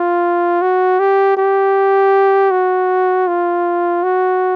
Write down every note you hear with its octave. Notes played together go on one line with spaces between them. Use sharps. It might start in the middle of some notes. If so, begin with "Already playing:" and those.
Already playing: F4
F#4
G4
G4
F#4
F4
F#4